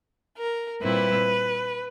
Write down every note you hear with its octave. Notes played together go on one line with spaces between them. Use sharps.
A#4
A#2 G3 C4 E4 B4